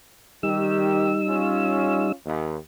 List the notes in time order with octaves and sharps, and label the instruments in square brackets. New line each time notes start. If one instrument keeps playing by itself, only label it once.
[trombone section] D#3 G4 [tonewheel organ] G3 D#4 E6
[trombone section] C#4 F4
D#2